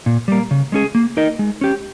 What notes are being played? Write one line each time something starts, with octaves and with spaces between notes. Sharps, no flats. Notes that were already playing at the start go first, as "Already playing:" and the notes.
A#2
G3 A#3
C#3
G#3 C#4 G#4
A#3
D#4 A#4 D#5
G#3
C#4 G4